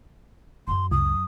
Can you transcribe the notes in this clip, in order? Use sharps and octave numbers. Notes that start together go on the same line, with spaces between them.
F#2 F#3 C6
C#2 D#6